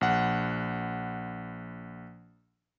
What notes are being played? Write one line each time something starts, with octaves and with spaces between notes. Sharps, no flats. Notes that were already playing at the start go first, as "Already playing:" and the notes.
A#1 F#5